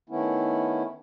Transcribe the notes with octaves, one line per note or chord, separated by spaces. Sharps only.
D#3 A3 B3 C#4 E4